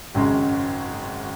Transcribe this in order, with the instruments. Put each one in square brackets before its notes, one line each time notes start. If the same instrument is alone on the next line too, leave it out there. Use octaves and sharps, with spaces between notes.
[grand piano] G#1 F#2 C#3 G#3